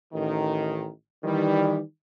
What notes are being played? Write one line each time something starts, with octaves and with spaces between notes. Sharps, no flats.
A1 D#3
D#3 E3 G3